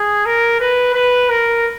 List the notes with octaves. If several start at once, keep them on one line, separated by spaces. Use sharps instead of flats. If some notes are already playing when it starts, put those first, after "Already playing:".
Already playing: G#4
A#4
B4
B4
A#4